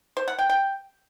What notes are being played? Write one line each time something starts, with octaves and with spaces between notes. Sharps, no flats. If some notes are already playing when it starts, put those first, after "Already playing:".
C5
F#5
G5
G5